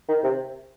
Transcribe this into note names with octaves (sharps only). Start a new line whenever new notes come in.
D#3
C3